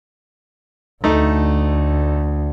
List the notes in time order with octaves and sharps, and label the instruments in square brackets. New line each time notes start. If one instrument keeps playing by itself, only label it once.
[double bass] D2 [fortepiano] A3 D#4